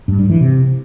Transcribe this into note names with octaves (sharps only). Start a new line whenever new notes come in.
G2
G2
E3
C3